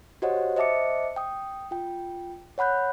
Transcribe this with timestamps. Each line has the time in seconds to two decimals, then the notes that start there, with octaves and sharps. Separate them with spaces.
0.22 F#4 G4 C5 C#5 D#5 F#5
0.56 C5 D#5 E5 A5 D6 C#7
1.16 G5 D#6
1.71 F4 G5
2.58 C#5 F#5 B5 F#6 G6